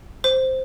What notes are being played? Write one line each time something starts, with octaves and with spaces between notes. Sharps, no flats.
C5